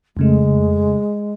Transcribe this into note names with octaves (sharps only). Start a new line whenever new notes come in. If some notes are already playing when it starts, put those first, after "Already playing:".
F2 C#3 G#3 A3